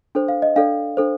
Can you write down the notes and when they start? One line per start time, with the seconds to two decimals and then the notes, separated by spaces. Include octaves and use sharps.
0.15 D4 A4 C5
0.28 F5
0.42 D#5
0.56 D4 A4 D5 F5
0.97 D4 A4 C5